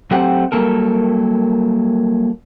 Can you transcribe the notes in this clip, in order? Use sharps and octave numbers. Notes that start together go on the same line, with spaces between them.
F#3 A3 C4 G4 C5 F#5
F#3 G3 A#3 A4 A#4